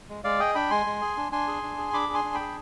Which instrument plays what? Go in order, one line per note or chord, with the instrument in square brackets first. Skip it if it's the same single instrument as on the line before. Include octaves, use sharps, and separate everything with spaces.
[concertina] G#3
G#3 D5 F5
G#4 D#5 G5
D4 G5 B5
G#3 G#5 C6
G#3
G#4
D4
D4 G#5 C6
G#4
D4
G#4
D4 B5 D6
G#4
G#5 C6
D4
G5 B5
G#4